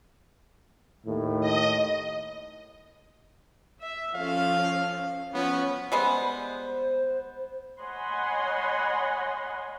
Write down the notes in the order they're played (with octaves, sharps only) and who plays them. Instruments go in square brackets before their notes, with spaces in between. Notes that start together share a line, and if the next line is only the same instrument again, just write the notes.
[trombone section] D#2 A2
[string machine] D#5
[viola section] E5
[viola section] F3 C#4 A4 [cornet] F5
[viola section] F3 C#4 C#5 [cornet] B3
[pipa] G3 G#3 B3 [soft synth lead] C5
[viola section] C#5 D#5 F#5 G#5 B5 C6